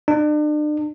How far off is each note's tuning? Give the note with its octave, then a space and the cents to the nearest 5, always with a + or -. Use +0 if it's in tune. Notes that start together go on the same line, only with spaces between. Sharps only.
D4 +40